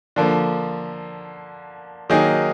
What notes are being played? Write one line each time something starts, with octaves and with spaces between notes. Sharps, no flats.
D3 F3 A#3
D#3 F#3 A#3 D#4 G#4